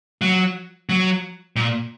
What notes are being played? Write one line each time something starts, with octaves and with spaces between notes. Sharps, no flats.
F#3
F#3
A#2